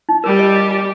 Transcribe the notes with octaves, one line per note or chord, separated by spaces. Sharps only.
D#4
G3 G4 A#4
D#5
D#5
G5